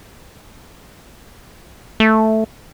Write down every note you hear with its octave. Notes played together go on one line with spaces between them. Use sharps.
A3